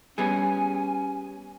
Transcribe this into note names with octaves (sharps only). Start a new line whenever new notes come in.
G3 B3 C#4 G#4 G#5